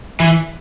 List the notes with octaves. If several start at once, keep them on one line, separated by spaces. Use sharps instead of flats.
E3